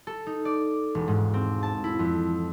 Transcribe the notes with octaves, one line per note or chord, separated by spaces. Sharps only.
A4
D#4
D5
E1
G#2
C4
A5
E4
F2